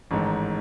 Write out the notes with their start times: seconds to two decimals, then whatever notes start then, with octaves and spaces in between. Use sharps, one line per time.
0.11 A1 G#2 D#3